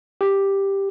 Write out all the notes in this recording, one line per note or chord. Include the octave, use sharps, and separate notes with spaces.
G4